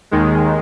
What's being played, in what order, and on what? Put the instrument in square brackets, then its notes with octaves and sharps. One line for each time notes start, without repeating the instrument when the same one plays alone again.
[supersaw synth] D#2 D#3 G#3